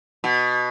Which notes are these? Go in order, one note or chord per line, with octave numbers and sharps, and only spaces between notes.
B2